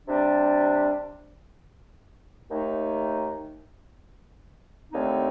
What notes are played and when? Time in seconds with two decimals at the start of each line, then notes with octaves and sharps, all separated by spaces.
0.06 C3 G3 D4
2.49 D#2 D#3 A3 D#4
4.92 D#2 D3 A3 C4 D#4